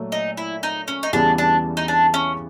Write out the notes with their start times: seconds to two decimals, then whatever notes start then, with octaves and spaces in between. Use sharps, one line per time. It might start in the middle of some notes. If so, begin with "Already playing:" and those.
Already playing: A#2 F#3 A3
0.12 D#4
0.37 E4
0.63 D#4
0.88 C#4
1.03 D#4
1.13 E2 C#3 E3 G3 B3 D4
1.38 D4
1.77 D#4
1.88 D4
2.14 C#4